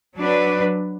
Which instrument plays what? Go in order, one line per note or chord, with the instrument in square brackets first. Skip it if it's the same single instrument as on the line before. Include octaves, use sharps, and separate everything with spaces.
[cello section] F#3 D4 B4